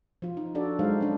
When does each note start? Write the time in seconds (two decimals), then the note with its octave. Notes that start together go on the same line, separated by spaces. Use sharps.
0.22 F3 F4
0.37 D#4
0.55 D4 F#4 A4 D5
0.79 F#3 G#3 D#4 C5 F5
1.01 C#4 D4